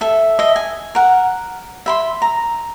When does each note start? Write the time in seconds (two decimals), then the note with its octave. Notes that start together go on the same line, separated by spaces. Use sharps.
0.01 A4 E5
0.39 D#5 E5
0.56 G#5
0.95 A#4 F#5
1.86 E5 B5 C6
2.22 A#5